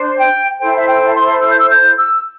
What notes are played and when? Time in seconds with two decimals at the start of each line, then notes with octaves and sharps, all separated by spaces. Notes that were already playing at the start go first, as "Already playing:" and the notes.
Already playing: D4 C5
0.18 G5
0.59 E4 A4 C5 G5
0.75 E5
0.87 G5
1.15 C6
1.42 E6
1.51 G6
1.59 E6
1.70 G6
1.98 E6